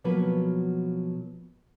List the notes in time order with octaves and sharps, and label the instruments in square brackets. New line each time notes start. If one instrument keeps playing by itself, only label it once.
[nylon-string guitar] B2 F3 F#3 A#3 B3 B4